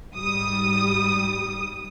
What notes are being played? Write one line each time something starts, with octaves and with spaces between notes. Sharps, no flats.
G#2 G3 D#6